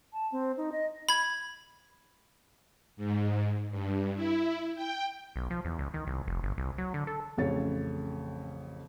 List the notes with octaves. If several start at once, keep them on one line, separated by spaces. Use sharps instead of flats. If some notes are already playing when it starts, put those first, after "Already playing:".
A5
C4
D#4
D#5
B5 G#6
G#2
G2
E4
G5
B1
F3
E2
C#2
D#3
C2
F1
G1
C2
F#3
D3
A4
A1 F2 C#3 C#5 A6